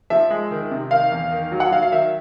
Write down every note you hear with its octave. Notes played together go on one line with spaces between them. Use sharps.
F3 E5
G#3
D#3
C3
D#3 F5
E2
D#3
F#3
F#5
F#3 F5
F5
D#3 E5